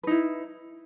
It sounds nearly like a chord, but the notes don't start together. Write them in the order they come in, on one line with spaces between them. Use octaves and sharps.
B4 D#4 E4